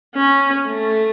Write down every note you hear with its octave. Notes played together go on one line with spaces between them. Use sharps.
C#4
A3